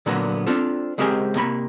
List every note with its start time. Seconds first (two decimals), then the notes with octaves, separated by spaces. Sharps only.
0.06 A#2 D3 F#3 A#3 B3
0.47 C4 D4 F4 A4
0.98 C#2 G#3 C4 G4 A#4 G#5
1.35 C3 A#3 B5